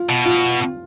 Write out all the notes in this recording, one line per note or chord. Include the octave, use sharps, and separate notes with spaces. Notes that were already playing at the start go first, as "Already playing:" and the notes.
Already playing: F4
B2
F4